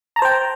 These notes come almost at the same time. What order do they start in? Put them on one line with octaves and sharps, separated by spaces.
A#5 A5 C5 G5